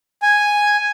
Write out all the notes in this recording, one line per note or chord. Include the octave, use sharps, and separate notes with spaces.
G#5